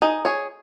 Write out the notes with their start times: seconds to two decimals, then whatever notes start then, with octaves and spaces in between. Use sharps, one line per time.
0.02 D#4 G#4
0.25 G#4 C#5